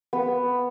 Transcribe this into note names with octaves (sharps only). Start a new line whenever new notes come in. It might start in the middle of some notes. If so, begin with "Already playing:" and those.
B3